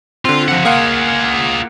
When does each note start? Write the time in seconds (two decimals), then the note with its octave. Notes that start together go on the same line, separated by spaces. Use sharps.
0.25 D3 C4 F4
0.48 F3 F#5
0.65 A#3 F4 G#4 F5 F#5